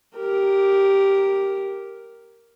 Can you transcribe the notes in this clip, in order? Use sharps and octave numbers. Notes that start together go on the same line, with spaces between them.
G4 A#4